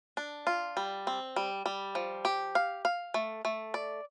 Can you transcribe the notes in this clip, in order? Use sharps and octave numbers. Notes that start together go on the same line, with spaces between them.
D4
F4
G3
C4
G3
G3
F3
G4
F5
F5
A3
A3
D5